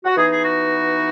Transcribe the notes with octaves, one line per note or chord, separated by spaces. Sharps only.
F#4
E3 B3 D#4 G#4
G#4
F#4